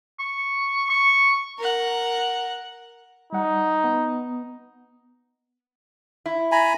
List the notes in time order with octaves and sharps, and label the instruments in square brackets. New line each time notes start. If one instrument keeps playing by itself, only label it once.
[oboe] C#6
C#6
[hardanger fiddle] A#4 F#5
[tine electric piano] G3 F#5 [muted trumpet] D#4
[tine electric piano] B3
[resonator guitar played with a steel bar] E4
[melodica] G#5 A#5 B5